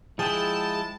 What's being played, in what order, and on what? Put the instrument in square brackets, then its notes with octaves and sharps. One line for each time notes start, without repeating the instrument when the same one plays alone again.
[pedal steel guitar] F3 G#3 E4 [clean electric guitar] G#4 [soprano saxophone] G5 [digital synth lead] A5